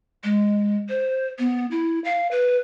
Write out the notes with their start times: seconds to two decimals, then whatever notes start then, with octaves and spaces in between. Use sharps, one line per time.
0.24 G#3
0.89 C5
1.39 B3
1.71 E4
2.05 F5
2.31 B4